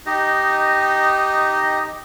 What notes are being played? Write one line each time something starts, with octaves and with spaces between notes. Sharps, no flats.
D#4 G4 D#5